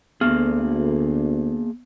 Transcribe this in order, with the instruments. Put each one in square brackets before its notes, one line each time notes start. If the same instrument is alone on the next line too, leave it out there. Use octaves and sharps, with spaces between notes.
[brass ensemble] D2 [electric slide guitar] A#3 G#4 [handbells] B3